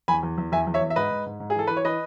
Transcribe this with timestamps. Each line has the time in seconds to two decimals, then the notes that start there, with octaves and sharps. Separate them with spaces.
0.08 E2 G#5 B5
0.23 E2
0.38 E2
0.52 E2 E5 G#5
0.67 E2
0.74 C#5 E5
0.81 E2
0.90 E5
0.96 G#2 B4 D#5
1.11 G#2
1.26 G#2
1.40 G#2
1.50 G#4
1.55 E3 A4
1.67 E3 B4
1.77 C#5
1.84 E3 B4 D#5